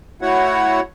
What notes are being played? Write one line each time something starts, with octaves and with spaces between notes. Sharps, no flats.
A3 E4 F#4 C#5 F#5